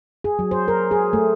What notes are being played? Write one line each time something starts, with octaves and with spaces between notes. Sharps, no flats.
G#4
F#3
C5
A#4
G#4
A3